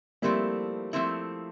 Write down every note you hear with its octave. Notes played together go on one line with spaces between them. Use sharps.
F3 G3 A3 A#3 C4 E4
F3 A3 C4 E4